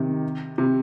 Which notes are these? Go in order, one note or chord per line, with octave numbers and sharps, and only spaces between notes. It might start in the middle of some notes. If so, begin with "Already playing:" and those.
Already playing: C3 D#3
C3